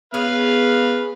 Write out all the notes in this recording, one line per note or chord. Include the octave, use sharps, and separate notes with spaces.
B3 C#4 G#4 B4 F5 F6